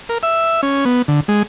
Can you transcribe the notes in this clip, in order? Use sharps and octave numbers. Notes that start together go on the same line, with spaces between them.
A#4
E5
C#4
B3
D3
G#3